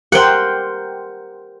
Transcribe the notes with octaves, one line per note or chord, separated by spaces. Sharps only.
G4 A#4 C5 F#5 G5